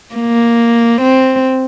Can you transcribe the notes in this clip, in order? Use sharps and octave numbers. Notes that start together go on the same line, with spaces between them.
A#3
C4